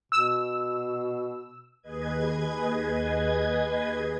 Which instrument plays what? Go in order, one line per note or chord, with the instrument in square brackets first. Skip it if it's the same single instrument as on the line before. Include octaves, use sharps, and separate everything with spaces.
[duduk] B2 [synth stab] E6
[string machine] D#2 G#4 B4 D#5 G#6